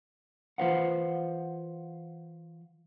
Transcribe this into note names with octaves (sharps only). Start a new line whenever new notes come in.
E3 F4 B4 C5 F5 F#5